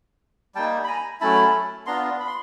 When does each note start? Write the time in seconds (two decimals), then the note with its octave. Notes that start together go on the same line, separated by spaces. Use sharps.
0.55 G3 A#3 D#4 G5 A5
0.84 B5
0.87 G#5 A#5
1.20 F#3 A3 C#4 E4 A5 B5
1.86 B3 D4 F4 A#5 C6
2.20 B5
2.27 C6